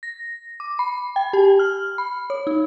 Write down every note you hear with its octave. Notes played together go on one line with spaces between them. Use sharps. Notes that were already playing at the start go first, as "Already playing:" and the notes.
A#6
D6
B5
G5
G4
F6
B5
C#5
D#4